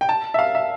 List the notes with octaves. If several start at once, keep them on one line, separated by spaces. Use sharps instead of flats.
G5
A5
E5
F5
E5